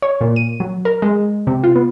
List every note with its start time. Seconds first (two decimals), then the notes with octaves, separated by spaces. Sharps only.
0.02 C#5
0.21 A#2
0.36 D#7
0.60 F#3
0.85 A#4
1.02 G#3
1.47 C3
1.64 F4
1.75 B3